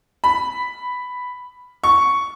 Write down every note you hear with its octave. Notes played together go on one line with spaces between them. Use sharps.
B5
C#6